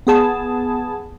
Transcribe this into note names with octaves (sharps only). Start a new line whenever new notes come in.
B3 G#4 A5